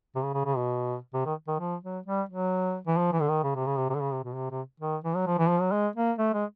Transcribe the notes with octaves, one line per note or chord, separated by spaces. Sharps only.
C3
C#3
C#3
C#3
B2
C3
D#3
D#3
F3
F#3
G3
F#3
E3
F3
E3
D3
D#3
C#3
C3
C#3
C3
C3
D3
C#3
C3
B2
C3
C3
D#3
E3
F#3
F3
E3
F3
F#3
G#3
A#3
A3
G#3